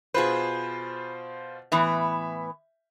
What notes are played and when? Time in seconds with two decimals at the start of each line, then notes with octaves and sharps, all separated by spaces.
0.14 B2 F4 G#4 B4 C5
1.72 A2 E3 B3 E5